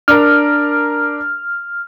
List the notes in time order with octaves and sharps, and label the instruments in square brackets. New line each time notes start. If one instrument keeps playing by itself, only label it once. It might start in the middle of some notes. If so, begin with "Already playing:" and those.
[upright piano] D4 A#4 [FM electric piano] F6